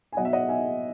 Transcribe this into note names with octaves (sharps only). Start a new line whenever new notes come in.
G#5
B2 F#3 D#5 F#5
E5
D#5 F#5
E5 G#5